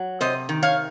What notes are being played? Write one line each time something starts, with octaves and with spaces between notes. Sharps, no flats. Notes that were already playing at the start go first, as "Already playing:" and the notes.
Already playing: F#3
C3 C5 D#5
D#3
C#5 F5